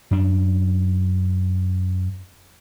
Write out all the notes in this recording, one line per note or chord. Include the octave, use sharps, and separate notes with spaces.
F#2 D4